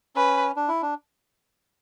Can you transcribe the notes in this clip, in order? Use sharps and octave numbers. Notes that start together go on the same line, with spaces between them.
C#4 B4
D4
E4
D4